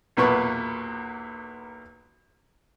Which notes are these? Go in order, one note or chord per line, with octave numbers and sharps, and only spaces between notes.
B1 E2 A#2 B4 C#6